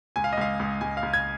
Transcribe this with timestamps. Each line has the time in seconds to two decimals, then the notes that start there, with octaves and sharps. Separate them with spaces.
0.16 C#2 G#5
0.24 F5
0.33 D#5
0.37 C#2 F5
0.60 C#2
0.81 C#2 G#5
0.97 F5
1.03 C#2
1.13 G#6